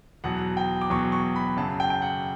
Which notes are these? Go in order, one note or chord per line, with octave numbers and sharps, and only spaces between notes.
E2 B2 F#3 F#5
G5
D6
E2 B2 F#3 C#6
C#6
B5
F#2 C#3 F#3 A5
G5
G5
F#5